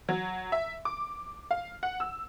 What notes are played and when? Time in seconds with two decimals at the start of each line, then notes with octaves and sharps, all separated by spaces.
0.09 F#3
0.52 E5
0.85 D6
1.51 F5
1.83 F#5
2.00 E6